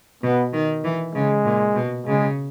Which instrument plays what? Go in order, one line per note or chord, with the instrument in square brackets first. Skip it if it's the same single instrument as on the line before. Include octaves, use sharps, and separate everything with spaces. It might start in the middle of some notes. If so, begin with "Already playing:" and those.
[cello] B2 [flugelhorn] B3
[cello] D#3
E3
[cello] C#3 [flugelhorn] G#3
[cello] A#2
B2
[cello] C#3 [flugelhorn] G#3